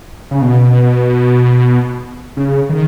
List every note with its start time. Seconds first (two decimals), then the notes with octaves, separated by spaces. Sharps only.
0.31 C#3
0.41 B2
2.37 C#3
2.69 D#3